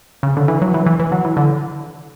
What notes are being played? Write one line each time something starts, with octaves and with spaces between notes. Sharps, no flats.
C#3
D3
E3
F#3
E3
E3
E3
F#3
E3
D3